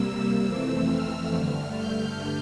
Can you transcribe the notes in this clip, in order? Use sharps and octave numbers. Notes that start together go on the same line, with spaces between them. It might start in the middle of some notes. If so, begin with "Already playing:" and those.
Already playing: C3 G3 A#3 E6
F2 E3 A3 C4
F6
G2 D3 A3 F6
G6